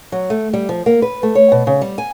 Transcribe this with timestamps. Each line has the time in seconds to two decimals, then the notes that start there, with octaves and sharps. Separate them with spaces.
0.12 F#3
0.30 A3
0.53 G3
0.69 F3
0.86 A#3
1.02 B4
1.23 A3
1.35 C#5
1.52 B2
1.67 C#3
1.81 G3
1.98 G#5